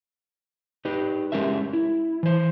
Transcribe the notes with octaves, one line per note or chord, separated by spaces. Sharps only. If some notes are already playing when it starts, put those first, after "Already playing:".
D#4 G4 B4
G#3 C#4 G4 A#4 E5
E4
E3 C5